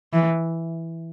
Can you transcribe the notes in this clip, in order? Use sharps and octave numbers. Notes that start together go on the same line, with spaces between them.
E3